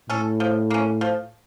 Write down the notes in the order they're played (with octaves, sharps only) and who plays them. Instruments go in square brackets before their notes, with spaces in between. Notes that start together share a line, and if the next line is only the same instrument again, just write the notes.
[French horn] A2 [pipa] C#4 A4
[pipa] F3
A#3 C#4
F3